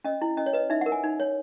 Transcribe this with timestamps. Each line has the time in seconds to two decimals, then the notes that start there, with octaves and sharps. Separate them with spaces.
0.04 C#4 D#5
0.21 E4
0.37 C#4 D#5
0.46 C#5
0.53 B4 D#5
0.70 D#4 E5
0.81 A#4 F#5
0.92 G#5
1.04 D#4
1.20 C#5